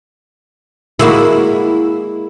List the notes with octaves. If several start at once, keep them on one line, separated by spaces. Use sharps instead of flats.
G#3 A#3 E4 F#4